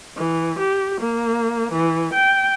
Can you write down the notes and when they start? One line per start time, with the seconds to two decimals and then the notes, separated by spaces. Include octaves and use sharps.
0.18 E3
0.58 G4
1.00 A#3
1.72 E3
2.14 G5